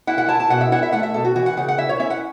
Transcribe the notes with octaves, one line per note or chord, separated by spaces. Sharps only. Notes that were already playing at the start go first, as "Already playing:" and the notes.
E4 F#5
F#5
E4 A5
A5
B2 F#5
E5
E4 F#5
E5
A3 F#5
E5
B2 A4
F#4
E3 F#4
F#5
C#3 F#5
F#5
E4 E5
C#5
C#4 E5
F#5